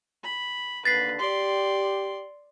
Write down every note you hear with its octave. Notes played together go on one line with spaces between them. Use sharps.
B5
D#2 D3 B4 A6 B6 C7
G4 D5 C6